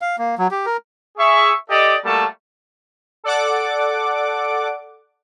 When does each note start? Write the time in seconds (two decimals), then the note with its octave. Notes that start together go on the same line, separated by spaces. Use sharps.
0.01 F5
0.18 A#3
0.38 F#3
0.51 G4
0.66 A#4
1.17 G#4 E5 C#6
1.70 G4 A4 D5 D#5
2.04 G3 A3 A#3 F#4 A4 A5
3.24 A4 D5 F#5 D6